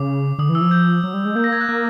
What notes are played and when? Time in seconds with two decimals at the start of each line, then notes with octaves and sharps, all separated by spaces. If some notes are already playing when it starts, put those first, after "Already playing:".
Already playing: C#3 D6
0.39 D3 D#6
0.49 E3
0.55 E6
0.61 F3
0.71 G6
1.04 F#3
1.14 G3
1.25 G#3
1.35 A#3 G6
1.44 A#6
1.52 G#6
1.61 F#6
1.69 A#3 F6